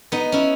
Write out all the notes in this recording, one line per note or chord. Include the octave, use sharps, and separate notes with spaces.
B3 D#4
C#4 E4